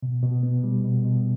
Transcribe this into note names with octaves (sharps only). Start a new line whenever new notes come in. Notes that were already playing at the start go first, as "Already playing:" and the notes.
B2
B2
B3
G3
B2
B2